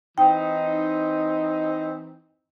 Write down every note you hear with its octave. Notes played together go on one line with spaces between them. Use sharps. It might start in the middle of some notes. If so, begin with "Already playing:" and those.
E3 C4 D#4 G5